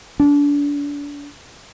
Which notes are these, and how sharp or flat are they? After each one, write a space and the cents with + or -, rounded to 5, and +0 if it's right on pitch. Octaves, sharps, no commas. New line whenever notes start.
D4 -30